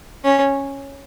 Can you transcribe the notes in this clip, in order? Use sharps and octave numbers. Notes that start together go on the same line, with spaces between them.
C#4